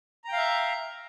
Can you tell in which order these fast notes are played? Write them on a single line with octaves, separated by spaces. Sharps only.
A#5 G5 F5 E5